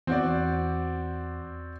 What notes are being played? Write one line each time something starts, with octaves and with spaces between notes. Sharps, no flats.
E2 C4 F#4 D5